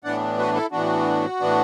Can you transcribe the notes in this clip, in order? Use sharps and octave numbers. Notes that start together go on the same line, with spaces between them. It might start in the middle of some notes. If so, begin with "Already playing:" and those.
A2 E3 B3 D4 D5 F#5
F#4 B4
E4 A4
A2 E3 B3 D4 F#4
A2 E3 B3 D4